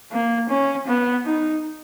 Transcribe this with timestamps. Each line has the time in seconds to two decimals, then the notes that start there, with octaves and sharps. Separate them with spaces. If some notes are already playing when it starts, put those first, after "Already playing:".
0.12 A#3
0.49 C#4
0.87 B3
1.25 D#4